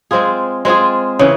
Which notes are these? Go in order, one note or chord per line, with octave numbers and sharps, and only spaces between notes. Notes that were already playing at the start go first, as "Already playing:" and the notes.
G#3 C4 F4 G#4
G#3 C4 F4 G#4
C#3 E3